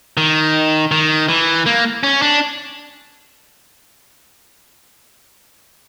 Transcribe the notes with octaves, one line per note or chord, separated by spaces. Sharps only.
D#3
D#3
E3
A#3
C#4
D4